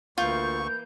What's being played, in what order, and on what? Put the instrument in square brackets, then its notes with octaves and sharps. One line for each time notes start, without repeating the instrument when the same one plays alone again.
[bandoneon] D2 C#6 [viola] E3 A#3 [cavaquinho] F4 [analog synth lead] G6